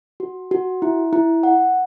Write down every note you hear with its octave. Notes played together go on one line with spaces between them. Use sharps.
F#4
F#4
E4
E4
F#5